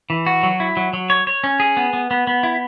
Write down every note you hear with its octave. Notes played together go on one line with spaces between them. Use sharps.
E3
F#4
F#3
E4
F#3
F#3
C#5
C#5
C#4
G#4
B3
B3
B3
B3
E4